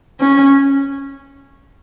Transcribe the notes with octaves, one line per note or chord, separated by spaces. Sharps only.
C#4